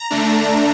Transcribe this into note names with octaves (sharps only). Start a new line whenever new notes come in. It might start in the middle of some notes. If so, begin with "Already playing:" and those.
Already playing: A#5
D3 A3 D4